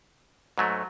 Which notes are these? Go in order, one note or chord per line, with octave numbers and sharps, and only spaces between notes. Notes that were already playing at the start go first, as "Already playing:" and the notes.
G#2 F#3 A3